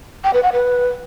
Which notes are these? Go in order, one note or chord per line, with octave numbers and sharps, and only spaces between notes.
G5
B4
F#5
B4